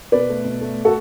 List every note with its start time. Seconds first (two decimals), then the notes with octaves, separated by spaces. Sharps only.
0.12 B2 B4 D5
0.29 A3
0.44 B2
0.61 A3
0.85 F#4 A4